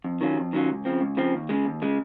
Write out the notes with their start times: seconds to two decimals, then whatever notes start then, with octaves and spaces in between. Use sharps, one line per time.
0.04 F2
0.21 D#3 F#3 C#4 F4
0.37 F2
0.53 D#3 F#3 C#4 F4
0.69 C#2
0.85 C#3 F3 C4
1.01 C#2
1.17 C#3 F3 C4
1.33 D#2
1.49 C#3 G#3
1.65 D#2
1.82 C#3 G#3